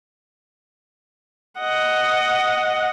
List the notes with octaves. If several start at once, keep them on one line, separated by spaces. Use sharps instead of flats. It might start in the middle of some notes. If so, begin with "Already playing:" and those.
D#5 F#5